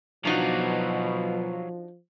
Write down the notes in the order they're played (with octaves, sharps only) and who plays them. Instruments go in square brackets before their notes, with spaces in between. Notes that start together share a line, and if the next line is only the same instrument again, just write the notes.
[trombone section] B2 [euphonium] F3 [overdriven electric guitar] F#3 F4 [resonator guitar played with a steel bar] D4 D#4 F#4